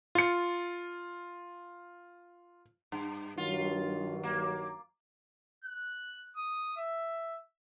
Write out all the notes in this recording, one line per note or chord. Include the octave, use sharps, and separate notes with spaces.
F4 C#7
G2
G2 D#3 F#3 F4
A#3
F#6
D#6
E5